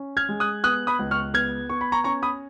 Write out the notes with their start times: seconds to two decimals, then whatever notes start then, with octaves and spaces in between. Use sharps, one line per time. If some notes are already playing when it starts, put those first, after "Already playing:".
Already playing: C#4
0.17 F6 G#6
0.29 G#3
0.40 D#6 F#6
0.64 B3 D#6 F#6
0.87 B5 D#6
0.99 C#2
1.11 C#6 F6
1.34 B3 F6 G#6
1.69 B3 C#6
1.81 B5
1.92 A#5 C#6
2.04 C#4 A#5 C#6
2.22 B5 D#6